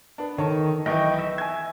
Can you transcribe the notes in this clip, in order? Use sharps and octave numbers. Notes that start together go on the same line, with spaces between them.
B3 D4
D#3 A4 C#5
B1 E3 D#5 G5 C#6
E5
G#5 G#6